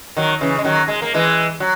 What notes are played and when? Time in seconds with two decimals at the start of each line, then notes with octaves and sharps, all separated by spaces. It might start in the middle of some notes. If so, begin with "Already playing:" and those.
0.17 D#3 F#3
0.41 C#3 E3
0.58 G#3
0.64 D#3 F#3
0.88 G#3
1.02 A#3
1.14 E3 G#3
1.60 F#3